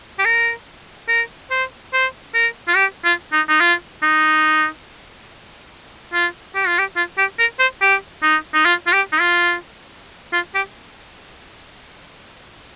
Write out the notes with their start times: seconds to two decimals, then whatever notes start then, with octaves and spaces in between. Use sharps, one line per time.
0.19 G4
0.25 A#4
1.09 A#4
1.51 C5
1.93 C5
2.34 A#4
2.68 F4
2.76 G4
3.04 F4
3.32 D#4
3.49 D#4
3.61 F4
4.03 D#4
6.14 F4
6.55 G4
6.67 F4
6.79 G4
6.97 F4
7.18 G4
7.39 A#4
7.60 C5
7.82 G4
8.23 D#4
8.54 D#4
8.65 F4
8.87 F4
8.93 G4
9.12 D#4
9.21 F4
10.33 F4
10.55 G4